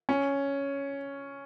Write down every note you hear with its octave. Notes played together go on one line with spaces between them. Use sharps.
C#4